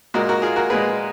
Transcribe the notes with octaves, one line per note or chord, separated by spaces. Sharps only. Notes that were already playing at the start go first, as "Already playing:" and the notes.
A#2 G#3 F#4 A#4
F#4 A#4
F4 G#4
F#4 A#4
A#2 G#3 G#4 B4